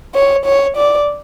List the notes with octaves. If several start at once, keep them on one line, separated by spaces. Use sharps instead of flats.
C#5
C#5
D5